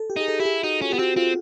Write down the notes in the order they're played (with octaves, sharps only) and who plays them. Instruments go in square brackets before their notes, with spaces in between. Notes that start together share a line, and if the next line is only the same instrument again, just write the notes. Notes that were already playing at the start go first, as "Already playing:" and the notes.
Already playing: [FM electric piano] A4
G4
[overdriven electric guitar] D#4 [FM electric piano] G#4
[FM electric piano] A4
[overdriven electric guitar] E4 [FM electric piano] G4
[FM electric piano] G#4
[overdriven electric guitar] D#4 [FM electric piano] F#4
[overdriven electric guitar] C#4 [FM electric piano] F4
[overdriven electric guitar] B3 [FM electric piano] G4
[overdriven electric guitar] C4 [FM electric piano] F#4
[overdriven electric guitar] C4 [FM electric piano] F4